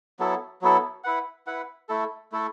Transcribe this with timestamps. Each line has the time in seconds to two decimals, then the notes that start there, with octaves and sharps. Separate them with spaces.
0.19 F#3 B3 E4 A4
0.62 F#3 B3 E4 A4
1.04 E4 B4 F#5
1.47 E4 B4 F#5
1.89 A3 E4 A4
2.32 A3 E4 A4